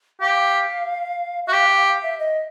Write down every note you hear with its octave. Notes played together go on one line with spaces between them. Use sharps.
G4 F5
F#4 E5
G4 F5
F5
F5
E5
D#5